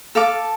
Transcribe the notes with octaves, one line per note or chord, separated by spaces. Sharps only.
A4 F5 A5 D6